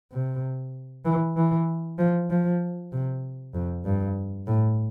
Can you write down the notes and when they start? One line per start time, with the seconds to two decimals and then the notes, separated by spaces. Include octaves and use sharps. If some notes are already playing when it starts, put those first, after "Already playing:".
0.12 C3
1.05 E3
1.36 E3
1.99 F3
2.30 F3
2.92 C3
3.54 F2
3.85 G2
4.47 A2